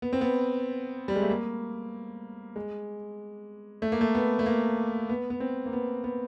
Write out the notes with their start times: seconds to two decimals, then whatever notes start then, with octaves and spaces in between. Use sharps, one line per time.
0.02 B3
0.13 C4
0.21 B3
1.08 G3
1.16 G#3
1.22 A3
1.30 A#3
2.56 G#3
3.82 A3
3.92 A#3
4.01 A3
4.15 B3
4.39 A3
4.46 A#3
5.09 B3
5.30 B3
5.40 C4
5.66 A#3
5.73 B3
6.04 B3